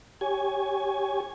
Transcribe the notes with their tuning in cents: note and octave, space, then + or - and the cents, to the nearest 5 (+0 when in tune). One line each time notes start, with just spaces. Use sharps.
G4 -5 C#5 +0 G#5 +0